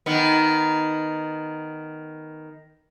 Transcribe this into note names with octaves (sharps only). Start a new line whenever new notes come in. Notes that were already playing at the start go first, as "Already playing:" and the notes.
D#3 B3